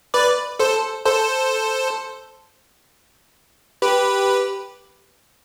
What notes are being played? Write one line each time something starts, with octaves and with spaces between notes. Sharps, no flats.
B4 D5
A4 C5
A4 C5
G4 B4